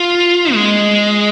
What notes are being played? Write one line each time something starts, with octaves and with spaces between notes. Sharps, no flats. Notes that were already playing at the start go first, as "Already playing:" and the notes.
Already playing: F4
G#3